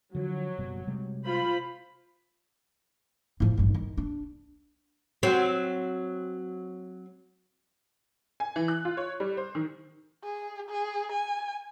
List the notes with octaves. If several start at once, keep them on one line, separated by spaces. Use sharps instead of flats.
D3 F3 F#3
F#1 B2 G3
C3 G3 G#3
F4 C5 B5
A2 F3
A1 G2
D#3
D4
F#3 C4
G#5
E3
F#6
F4
C#5
G3
C5
D#3
G#4
G#4
G#5